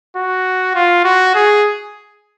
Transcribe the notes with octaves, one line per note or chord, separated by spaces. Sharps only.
F#4
F4
F#4
G#4